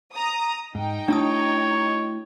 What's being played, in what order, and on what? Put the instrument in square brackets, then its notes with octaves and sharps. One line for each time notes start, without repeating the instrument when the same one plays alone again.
[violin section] A#5 D#6
[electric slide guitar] G#2 [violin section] D#4 G5
[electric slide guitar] A3 E4 F#4 [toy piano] D4 A5 D#6 [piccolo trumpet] C#5